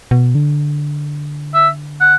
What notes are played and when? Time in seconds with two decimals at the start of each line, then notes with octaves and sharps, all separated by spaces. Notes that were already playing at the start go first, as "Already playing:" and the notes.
0.11 B2
0.35 D3
1.54 E5
2.01 F#5